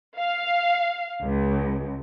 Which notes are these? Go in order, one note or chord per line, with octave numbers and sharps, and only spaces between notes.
F5
C#2